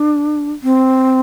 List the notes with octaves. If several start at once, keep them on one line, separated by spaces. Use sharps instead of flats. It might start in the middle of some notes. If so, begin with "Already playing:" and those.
Already playing: D4
C4